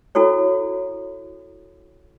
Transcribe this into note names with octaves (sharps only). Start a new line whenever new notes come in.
E4 F#4 A4 C#5